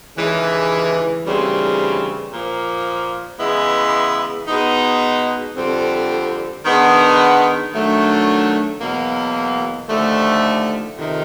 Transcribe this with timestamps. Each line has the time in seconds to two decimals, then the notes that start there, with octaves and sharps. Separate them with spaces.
0.16 D#2 C#3 E3 G#3
1.24 D2 C#3 E3 G3 C4
2.32 A#2 F3 A#3
3.39 C#3 E3 G#3 B3 E4
4.48 B2 G#3 B3 D#4
5.56 F2 D3 G3 C4
6.65 D#3 G#3 B3 D4
7.72 D#3 F#3 A3 D4
8.80 E2 B2 F#3 A#3
9.89 D#2 D3 F3 A3
10.97 F2 C3 D#3